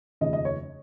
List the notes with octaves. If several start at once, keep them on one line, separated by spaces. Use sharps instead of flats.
F1 D#2 C#3 F3 D#5
D#5
C#5